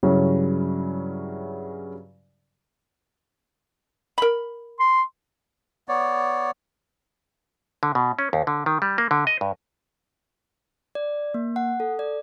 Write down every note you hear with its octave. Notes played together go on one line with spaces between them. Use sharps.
G2 C#3 F#3 C#4 E4
A#4 B5
C6
B3 C#5 D5
D3
B2
C#4
D#2
D3
D#3
G3
A#3
D3
D#5
G2
D5
A#3
F#5
A4
D5